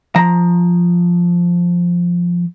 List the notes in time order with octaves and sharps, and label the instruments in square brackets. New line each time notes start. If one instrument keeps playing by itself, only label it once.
[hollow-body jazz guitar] F3 A#5